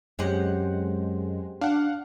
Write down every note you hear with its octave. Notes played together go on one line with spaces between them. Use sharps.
F#2 G#3 C4 G4 F#5
D4 F5 F#5